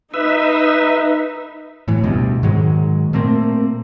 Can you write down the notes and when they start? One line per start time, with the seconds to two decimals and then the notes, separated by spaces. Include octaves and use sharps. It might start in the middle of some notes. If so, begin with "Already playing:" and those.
0.14 D#4 B4 E5
1.88 A2 E3
2.03 D2 G2 B2
2.43 G#2 D#3 F#3 G#3
3.13 A#2 A3 A#3 C4